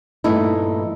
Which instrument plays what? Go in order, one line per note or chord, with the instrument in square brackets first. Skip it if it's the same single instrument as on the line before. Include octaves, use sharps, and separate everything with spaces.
[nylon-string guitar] G2 A#2 E3 A3 D#4 E4